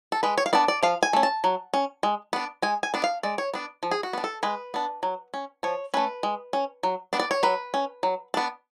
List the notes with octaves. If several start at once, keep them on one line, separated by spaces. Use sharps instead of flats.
A4
G#3 B4
C#5
F5
B3 D4 D5
D5
F3 F5
G#5
A3 C#4
A5
F#3
C#4
G#3
B3 D4
G#3 G#5
G#5
B3 D4
F5
G#3 D5
C#5
B3 D4
F3
G#4
F#4
B3 D4
A4
G#3 B4
B3 D4
F#3
C#4
F3 C#5
A3 C#4 B4
G#3
C#4
F#3
B3 D4
D5
C#5
F#3 B4
C#4
F#3
B3 D4